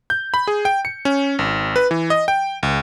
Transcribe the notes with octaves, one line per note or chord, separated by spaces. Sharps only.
G6
B5
G#4
G5
C#7
C#4
G#1
B4
E3
D#5
G5
C#2